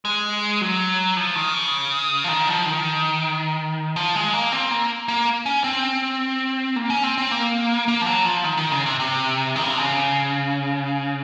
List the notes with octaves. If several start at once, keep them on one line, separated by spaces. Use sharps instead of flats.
G#3
F#3
F3
D#3
C#3
F3
D#3
F3
D#3
F3
G#3
A#3
C4
A#3
A#3
C#4
C4
A#3
C#4
C4
C4
A#3
A#3
F3
F#3
F3
D#3
D#3
C#3
C3
C3
D#3
C#3
C3
C#3